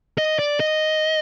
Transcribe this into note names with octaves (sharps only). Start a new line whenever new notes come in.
D#5
D5
D#5